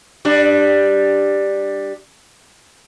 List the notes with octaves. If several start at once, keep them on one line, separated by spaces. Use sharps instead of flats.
G3 D4